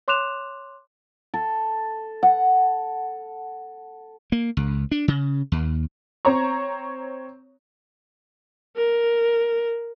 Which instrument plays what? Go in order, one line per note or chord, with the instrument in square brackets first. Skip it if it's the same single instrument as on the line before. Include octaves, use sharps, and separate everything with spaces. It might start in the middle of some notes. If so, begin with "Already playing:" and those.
[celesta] C#5 C6 D6 F#6 E7 F7
[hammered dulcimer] A4
F#5
[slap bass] A#3
C#2
D4
C#3
D#2
[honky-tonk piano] C4 C#5 A#5 C#6
[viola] A#4